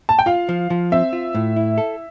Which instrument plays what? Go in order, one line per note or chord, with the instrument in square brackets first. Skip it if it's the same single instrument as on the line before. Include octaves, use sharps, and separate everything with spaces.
[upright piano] A5
G5
[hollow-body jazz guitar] F4 [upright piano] F5
[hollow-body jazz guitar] F3
F3
[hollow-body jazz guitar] C4 [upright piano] E5
[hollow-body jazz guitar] F4
A2
E4
A4